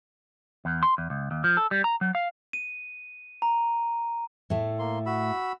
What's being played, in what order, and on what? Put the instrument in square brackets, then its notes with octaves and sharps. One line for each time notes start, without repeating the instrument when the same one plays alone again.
[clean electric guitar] E2
C6
E2
C#2
D#2
F3
A4
G3
A#5
F#3
F5
[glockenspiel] D#7
A#5
[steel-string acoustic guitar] A2 A3
[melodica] A#3 C6
F#4 B5 E6